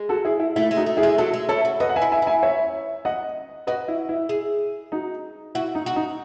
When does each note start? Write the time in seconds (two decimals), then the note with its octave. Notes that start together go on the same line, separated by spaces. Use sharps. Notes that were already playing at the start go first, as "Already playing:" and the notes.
Already playing: G#3
0.09 F#4 A4
0.25 E4 G#4
0.40 E4
0.56 A3 E4
0.71 G#3
0.77 D#4 F#4
0.86 A3
0.97 E4 G#4
1.03 G#3
1.18 F#3 F#4 A4
1.33 G#3
1.49 E4 A4 C#5
1.65 F#4
1.80 F#4 B4 D#5
1.89 F#5
1.96 E5 G#5
2.02 E4
2.12 E5 G#5
2.22 E4
2.27 E5 G#5
2.43 C#5 E5
3.05 D#5 F#5
3.67 F#4 B4 D#5
3.88 E4
4.09 E4
4.29 G#4
4.92 D#4 F#4
5.55 E4 F#4
5.75 D#4
5.86 F#4
5.96 D#4